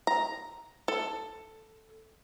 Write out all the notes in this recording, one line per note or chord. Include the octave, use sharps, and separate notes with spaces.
A#5
A4